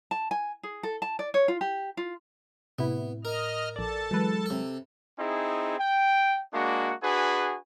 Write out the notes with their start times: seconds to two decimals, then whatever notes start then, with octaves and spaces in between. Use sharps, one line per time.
0.11 A5
0.31 G#5
0.63 G#4
0.83 A4
1.02 A5
1.19 D5
1.34 C#5
1.48 F4
1.61 G4
1.97 F4
2.79 A2 C3 B3 E4
3.25 A#4 D#5 F6
3.76 A#1 A4 D5 A5
4.11 E3 F#3 G#3 B4
4.46 C3 A4
5.19 C4 D#4 E4 G#4
5.79 G5
6.54 G#3 A#3 D4 F#4
7.03 D4 F#4 G#4 B4 G#5